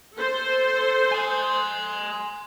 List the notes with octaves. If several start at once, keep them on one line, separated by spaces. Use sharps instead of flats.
A4 C5
G#5 C6